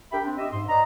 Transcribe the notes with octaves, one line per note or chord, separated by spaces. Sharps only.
D4 G4 A#4 E5 G5 B5
C4 D4
G4 D#5 E5
G#2 C6
B4 D5 D#5 A#5